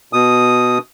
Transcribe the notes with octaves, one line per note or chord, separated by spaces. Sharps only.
B2 D#6